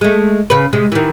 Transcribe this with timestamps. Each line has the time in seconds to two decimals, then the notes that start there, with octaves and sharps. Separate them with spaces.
0.01 G#3 A3
0.50 C#3 B4
0.73 C3 G#3
0.92 D#3 E3